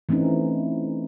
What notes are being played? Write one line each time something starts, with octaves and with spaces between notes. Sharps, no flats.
E3 A3 C4 C#4 D#4